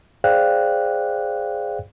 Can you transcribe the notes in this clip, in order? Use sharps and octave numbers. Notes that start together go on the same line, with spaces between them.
G#4 C5 D5 F5 G5 F#6